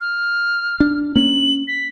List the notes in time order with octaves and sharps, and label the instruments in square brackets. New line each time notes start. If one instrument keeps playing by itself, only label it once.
[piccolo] F6
[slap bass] D4
[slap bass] A#3 C#4 [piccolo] F#7
[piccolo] B6